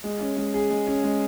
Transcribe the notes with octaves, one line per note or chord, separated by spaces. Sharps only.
G#3
C#4
G#3
G#4
G#3
C#4
G#3